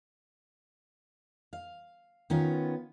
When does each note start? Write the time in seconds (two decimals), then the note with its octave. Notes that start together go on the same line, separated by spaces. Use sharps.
1.53 F5
2.30 D#3 B3 C#4 F4